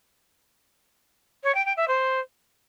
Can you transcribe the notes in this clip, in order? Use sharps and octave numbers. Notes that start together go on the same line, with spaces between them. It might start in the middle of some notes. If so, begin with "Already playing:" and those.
C#5
G5
G5
E5
C5